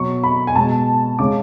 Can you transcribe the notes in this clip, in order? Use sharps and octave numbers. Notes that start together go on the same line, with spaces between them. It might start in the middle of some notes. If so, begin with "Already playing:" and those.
Already playing: B2 F#3 C#6
B5
G#5
B2 G#3 A5
C#3 G#3 D6